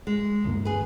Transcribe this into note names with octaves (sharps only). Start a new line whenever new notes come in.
G#3
D2 G2 A#3
G#4 B4